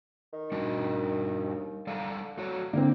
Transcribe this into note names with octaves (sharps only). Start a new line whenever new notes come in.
D#3
G3 D4 F#4
D#2
D3 G3 A4 F5
A3 F#4 C#5
D3 A#3 C4